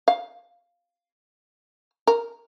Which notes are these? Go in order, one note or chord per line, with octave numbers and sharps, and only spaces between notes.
F5
A#4